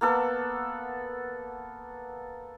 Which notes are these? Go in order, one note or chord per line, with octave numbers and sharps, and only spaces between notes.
A#3 B3 A4 F#5